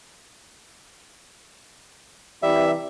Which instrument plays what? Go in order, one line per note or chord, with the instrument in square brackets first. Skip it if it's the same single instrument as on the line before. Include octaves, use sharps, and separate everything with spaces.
[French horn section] C3 E3 [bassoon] G3 [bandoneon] E5